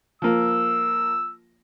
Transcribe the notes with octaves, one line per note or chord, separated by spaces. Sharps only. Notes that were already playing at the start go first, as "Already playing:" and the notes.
F3 A#3 E6